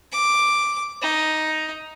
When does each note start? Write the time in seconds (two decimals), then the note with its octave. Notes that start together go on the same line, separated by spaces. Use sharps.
0.12 D6
1.02 D#4